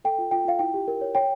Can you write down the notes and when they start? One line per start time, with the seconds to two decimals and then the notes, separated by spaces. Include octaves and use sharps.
0.05 A4 G5
0.18 F4
0.31 F4 G5
0.45 F4 F5
0.59 E4 G5
0.74 G4
0.88 A#4
1.01 C#5
1.15 C#5 G5